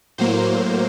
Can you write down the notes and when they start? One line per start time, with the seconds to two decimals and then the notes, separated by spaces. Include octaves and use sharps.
0.18 A2 F#3 A#3 C5